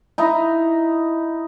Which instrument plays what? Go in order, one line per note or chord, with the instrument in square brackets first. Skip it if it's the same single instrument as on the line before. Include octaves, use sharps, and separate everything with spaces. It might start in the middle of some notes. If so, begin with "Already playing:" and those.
[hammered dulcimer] D#4 E4 A#5